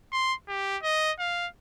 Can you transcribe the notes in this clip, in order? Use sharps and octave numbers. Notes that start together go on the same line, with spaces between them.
C6
G4
D#5
F5